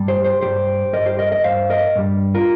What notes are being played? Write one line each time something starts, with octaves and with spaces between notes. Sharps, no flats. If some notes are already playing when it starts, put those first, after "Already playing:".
Already playing: G2 G3
G4 C5
G4 C5
G2 G3 G4 C5
G2 G3 A#4 D#5
G4 C5
A#4 D#5
A#4 D#5
G2 G3 C5 F5
A#4 D#5
G2 G3
F4 A#4